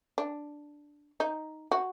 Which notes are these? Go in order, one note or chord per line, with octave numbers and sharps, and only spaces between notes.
D4
D#4
F#4